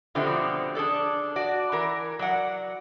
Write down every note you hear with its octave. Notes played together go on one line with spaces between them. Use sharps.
B2 D3 F3 A3 C4 G4
D4 G#4 A4 D5
F#4 D5
E3 A#4
F#3 D5 F#5